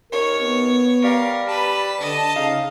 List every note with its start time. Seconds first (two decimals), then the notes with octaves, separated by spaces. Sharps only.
0.12 D#2 A#4 C#5
0.42 B3
1.04 G3 A#4 F5
1.48 G4 B4 A5
2.01 D3 D#5
2.36 C#3 D#4 F5